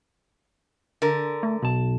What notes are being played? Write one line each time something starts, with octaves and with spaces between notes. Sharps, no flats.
D3 A#4
A3
B1 A5